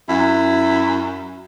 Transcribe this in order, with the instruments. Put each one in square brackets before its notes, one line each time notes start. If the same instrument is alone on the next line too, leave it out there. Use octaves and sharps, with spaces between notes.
[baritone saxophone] F#2 [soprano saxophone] E4